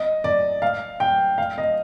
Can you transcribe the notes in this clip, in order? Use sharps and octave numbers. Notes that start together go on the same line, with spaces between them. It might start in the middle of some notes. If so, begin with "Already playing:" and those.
Already playing: D#5
D5
F5
G5
F5
D#5